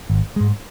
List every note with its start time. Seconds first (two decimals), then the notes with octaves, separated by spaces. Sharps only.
0.10 G#1
0.36 G#2 G#3